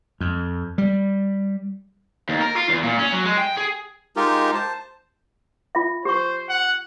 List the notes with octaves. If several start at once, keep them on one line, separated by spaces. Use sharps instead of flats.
F2
G3
D#2
A#4
F4
E2
A#2
C#4
F#3
G#3
G5
G#4
G#3 D#4 F4 G4 A#4
C5 A5
F4 E5
G4 C5 C#6
F#5